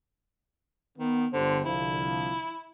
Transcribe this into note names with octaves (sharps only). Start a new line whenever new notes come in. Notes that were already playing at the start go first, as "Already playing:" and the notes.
D#3 B3
G1 D3 G4 C5
C2 D3 F3 E4